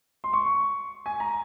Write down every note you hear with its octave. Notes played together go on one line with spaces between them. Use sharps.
C6
C#6
G#5
A#5